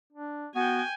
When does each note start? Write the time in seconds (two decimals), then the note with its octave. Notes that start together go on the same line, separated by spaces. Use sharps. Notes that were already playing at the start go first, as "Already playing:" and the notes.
0.12 D4
0.55 B3 F#4 G5 G#5